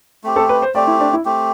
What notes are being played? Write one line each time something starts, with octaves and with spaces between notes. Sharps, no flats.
A3 C4 G4
A4
B4
C5
A3 C4 G4 D5
E4
D4
E4
A3 C4 G4